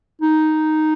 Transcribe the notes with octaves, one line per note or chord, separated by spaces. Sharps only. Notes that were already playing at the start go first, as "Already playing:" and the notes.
D#4